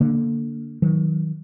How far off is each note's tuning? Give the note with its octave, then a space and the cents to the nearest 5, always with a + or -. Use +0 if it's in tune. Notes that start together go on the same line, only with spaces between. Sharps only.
D3 -5 A#3 +0
D#3 +30 F#3 +0